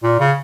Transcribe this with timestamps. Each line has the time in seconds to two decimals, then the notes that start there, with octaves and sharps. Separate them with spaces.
0.03 A#2
0.20 C#3